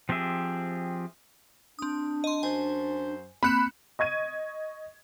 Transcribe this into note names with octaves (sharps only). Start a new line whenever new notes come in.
F3 C4 G4 G#4 E5
C4 D4 D#6
D#5 C6
F#2 C5 G#5
A#3 C4 B5 F#6 C#7 E7
D#5 C#6 G#6 D#7